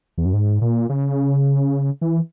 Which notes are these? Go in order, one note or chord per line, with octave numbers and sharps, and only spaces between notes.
E2
F#2
G#2
A#2
C#3
E3